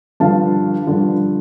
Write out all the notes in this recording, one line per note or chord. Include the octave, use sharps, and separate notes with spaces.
G2 D3 F3 F5 A5
G2 D3 F3